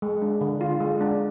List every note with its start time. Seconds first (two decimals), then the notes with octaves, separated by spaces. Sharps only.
0.02 G#3
0.22 D4
0.41 D3
0.61 F4
0.80 G#3
1.01 D4